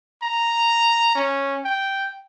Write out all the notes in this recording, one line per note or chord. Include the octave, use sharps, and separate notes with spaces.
A#5
C#4
G5